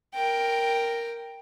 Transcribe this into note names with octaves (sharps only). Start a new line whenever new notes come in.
A#4 G5